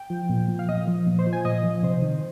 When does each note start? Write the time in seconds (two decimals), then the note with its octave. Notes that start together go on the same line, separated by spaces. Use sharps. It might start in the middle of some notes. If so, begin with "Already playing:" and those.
Already playing: G5
0.10 F3
0.29 A#2
0.48 F3
0.59 F5
0.69 A#2 D#5
0.87 F3
1.07 A#2
1.19 C5
1.26 F3
1.33 G#5
1.45 A#2 D#5
1.64 F3
1.83 C3 C5
2.02 D#3